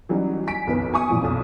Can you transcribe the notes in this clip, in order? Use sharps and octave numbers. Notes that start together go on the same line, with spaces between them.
E3 F#3 G3 C#4 D#4 F#4
G#5 B6 D7
B1 F2 B2 D#3 B4
G#5 C#6 D#6
A#2 E3 F3
B1 F2